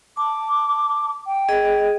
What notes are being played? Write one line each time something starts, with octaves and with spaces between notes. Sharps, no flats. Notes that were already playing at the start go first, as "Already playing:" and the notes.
A5 D6
G5
G#4 D#5